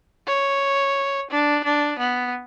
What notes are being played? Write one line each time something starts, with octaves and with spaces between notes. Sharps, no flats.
C#5
D4
D4
B3